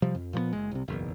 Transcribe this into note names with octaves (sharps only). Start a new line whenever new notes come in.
C3 F3 G3
F2
A#2 F3 G3 B3
F#1 G#3
C2 C3
F#1 B1 E2